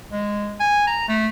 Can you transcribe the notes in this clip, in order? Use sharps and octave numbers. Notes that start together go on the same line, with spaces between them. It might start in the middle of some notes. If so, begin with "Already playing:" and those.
G#3
G#5
A#5
A3